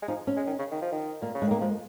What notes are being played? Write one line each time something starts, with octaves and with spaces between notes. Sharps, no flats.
G#3
F3 D#4
C#4
G#3
D#3
C#3
D#3
F3
D#3
A#2 A#3
C#3
G#3
D#3 A#3
F3 G#3